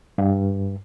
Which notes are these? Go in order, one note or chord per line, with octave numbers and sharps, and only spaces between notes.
G2